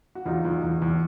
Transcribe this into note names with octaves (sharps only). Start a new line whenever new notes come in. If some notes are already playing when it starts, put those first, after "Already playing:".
F#4
E2 D#4 F4
E2
E2
E2